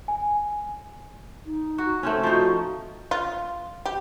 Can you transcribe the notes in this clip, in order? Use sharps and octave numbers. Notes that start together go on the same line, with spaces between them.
G#5
D#4
F#4
A3 C4 C#4 C5
F3 D#4 F#4
F4
G4